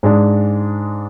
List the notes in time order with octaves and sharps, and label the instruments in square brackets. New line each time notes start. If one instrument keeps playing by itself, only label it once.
[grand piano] G#2 G#3 D4